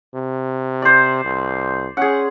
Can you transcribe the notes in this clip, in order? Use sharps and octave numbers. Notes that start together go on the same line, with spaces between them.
C3
C5 D5
C2
C#4 G#4 F#5